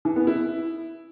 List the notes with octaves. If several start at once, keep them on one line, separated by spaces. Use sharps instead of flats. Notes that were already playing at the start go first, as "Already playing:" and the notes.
E3
B3
E4